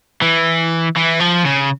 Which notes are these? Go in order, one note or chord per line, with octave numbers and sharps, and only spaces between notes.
E3
E3
F3
C#3